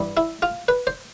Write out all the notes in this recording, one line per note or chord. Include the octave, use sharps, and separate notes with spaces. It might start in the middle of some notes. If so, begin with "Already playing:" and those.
Already playing: G2 E3 G3
E4
F4
B4
C5